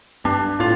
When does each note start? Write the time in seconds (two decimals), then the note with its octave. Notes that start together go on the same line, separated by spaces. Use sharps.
0.25 G2 D4
0.60 A2 F4